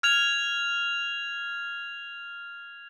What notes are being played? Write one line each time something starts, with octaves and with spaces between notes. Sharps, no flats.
F6 G#6 F7